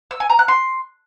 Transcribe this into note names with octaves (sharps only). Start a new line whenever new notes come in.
E6
G#5
A#5
F#6
C6